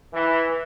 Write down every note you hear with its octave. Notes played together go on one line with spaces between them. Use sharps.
E3